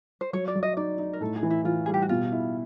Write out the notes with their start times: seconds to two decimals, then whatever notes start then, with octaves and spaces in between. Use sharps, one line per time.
0.21 C5
0.33 F#3 C#5
0.48 D5
0.55 F#3
0.63 D#5
0.77 D#4 D5
0.99 D#4
1.13 A#4
1.21 A2 A4
1.36 G#4
1.43 E3
1.50 E4
1.65 E3 F4
1.86 G3 G#4
1.94 G4
2.02 F#4
2.09 B2 F4
2.32 E4